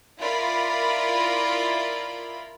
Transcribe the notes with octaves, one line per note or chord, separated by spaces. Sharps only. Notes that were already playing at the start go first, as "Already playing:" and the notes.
E4 F4 A#4 D5 B5